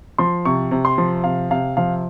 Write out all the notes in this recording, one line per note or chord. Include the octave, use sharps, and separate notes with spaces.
F3 C6
C3 C#6
C3
C6
F3
C3 F5
C3 F5
F3 F5